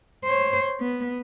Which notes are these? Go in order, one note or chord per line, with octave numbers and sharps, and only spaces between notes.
C5 C#5
B3